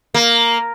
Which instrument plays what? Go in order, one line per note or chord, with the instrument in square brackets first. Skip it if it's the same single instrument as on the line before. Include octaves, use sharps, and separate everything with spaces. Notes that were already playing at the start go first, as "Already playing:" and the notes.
[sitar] A#3